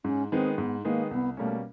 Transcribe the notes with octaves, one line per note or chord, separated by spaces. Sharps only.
G#2 C#4
D#3 G#3 B3 C4
G#2 B3
D#3 G#3 A#3 B3
C2 B3
B2 G3 A3 A#3 C#4